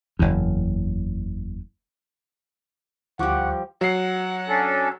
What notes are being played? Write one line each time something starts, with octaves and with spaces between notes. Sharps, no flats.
F#1 E2
D2 F3 G3 F#5 C#6 D6
F#3 F#5 C7
C#4 D4 A4